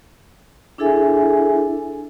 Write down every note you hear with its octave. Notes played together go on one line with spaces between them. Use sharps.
D4 E4 G#4 A4 E5 G#5